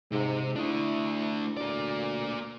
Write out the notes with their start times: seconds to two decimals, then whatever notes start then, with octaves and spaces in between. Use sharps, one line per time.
0.12 G#2 C3
0.56 A3 D4 E4
1.57 D2 A#3 D5